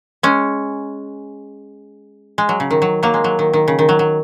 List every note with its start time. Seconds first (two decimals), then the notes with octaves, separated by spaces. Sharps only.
0.23 G#3 C#4
2.38 G#3
2.49 F#3
2.60 C#3
2.71 D#3
2.82 F#3
3.03 F#3 A#3
3.14 G#3
3.24 F#3
3.39 D#3
3.53 D#3
3.68 C#3
3.79 D#3
3.89 F#3
3.99 F#3